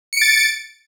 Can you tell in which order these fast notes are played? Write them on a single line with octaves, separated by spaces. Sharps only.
C#7 D7 A6